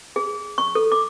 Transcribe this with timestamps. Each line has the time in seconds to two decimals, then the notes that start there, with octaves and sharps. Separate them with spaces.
0.16 G#4
0.58 C#6
0.75 A4
0.92 D6